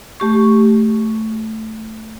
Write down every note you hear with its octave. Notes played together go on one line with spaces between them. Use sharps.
A3 G4 C#6